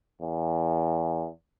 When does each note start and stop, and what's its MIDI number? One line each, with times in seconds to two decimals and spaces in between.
0.22 1.27 40